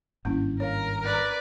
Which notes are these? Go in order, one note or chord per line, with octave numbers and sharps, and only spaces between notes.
G#1 G2 A#3 C#4 E4
A#4 C#5 F5
B4 D5